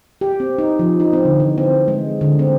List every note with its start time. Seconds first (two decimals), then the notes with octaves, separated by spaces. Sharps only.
0.21 G4
0.40 C4
0.58 D#4
0.79 F3
1.00 D#4
1.13 C4
1.25 D3
1.40 E3
1.58 C4
1.88 G#3
2.21 D3
2.39 C4